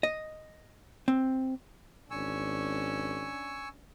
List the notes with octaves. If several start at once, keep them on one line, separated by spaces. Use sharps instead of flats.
D#5
C4
G#1 C#4 D4 G#5 C#6 E6